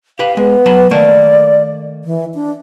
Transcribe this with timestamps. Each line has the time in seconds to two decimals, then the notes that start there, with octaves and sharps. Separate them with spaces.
0.19 G4 B4 F5
0.37 G#3 B3
0.66 F#3 A5 B5
0.91 D#3 A3 A#3 D5
2.04 E3
2.34 D4